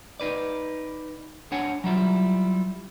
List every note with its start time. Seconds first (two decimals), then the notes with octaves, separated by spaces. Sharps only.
0.20 D#4 B4 D5
1.52 D4 C#5 F#5 G#5
1.84 F#3 G3 E4 F4